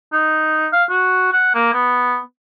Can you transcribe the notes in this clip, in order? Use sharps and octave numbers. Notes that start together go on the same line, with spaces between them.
D#4
F5
F#4
F#5
A#3
B3